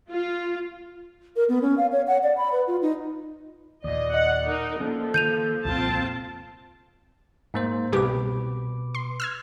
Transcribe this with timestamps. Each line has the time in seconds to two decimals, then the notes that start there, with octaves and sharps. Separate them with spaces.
0.10 F4
1.36 A#4
1.49 B3
1.62 C#4
1.78 F5
1.92 C#5
2.07 F#5
2.23 D5
2.37 B5
2.52 B4
2.67 F4
2.82 D#4
3.84 D#2 A#2 D5 D#5
4.14 D#5 F#5
4.47 D#4 A#4
4.80 F3 A#3 C#4 A4
5.14 D#3 A#3 G6 D#7 F7
5.65 C2 F2 A#2 C4 F4 A5
7.54 G#2 A#3 C5
7.92 C2 B2 G4 B4 D6
8.95 C6
9.20 E6 F6 G#6